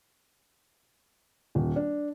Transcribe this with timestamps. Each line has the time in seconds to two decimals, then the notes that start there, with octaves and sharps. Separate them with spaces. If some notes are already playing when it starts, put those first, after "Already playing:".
1.55 D#1
1.76 D4